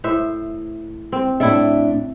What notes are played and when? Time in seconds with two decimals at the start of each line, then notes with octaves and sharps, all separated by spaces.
0.04 A2 C5 E5
1.12 C4
1.40 A2 D4 E4 A4 E5